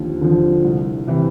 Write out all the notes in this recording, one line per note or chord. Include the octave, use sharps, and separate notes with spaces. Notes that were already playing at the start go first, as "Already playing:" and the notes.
Already playing: D#2 D3 F3
D3 F3
C2
C3 E3